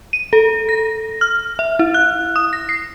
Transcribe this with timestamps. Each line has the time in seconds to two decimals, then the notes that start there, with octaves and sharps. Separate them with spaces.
0.13 D#7
0.33 A4
0.69 A#6
1.21 F6
1.59 E5
1.79 E4
1.94 F#6
2.36 D#6
2.53 A#6
2.69 C7